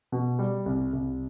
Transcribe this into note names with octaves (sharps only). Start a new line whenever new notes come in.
B2
G3
C2
C2